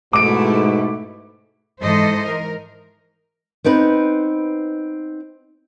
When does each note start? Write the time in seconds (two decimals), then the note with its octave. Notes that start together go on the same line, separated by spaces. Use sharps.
0.13 G#2 B2 A3 E4 D6 D7
1.81 G#2 E3 A4 C5 D#5
2.26 A#4
3.64 B3 C4 D#4 B4